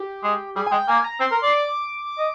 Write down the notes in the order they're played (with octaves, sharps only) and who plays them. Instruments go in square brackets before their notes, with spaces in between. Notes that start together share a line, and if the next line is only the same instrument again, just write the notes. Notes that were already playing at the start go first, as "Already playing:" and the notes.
Already playing: [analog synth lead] G4
[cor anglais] G#3
[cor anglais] G3 [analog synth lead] G#4
[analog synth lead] G#5
[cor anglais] G#3 [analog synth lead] G5
[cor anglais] A#3 [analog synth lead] G#5
[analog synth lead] A#5
[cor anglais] C4 [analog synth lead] C6
[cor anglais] A#4
D5
[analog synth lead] D6
[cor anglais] D#5